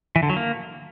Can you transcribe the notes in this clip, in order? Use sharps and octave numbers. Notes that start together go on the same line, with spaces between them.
E3
D3
F#3
A#3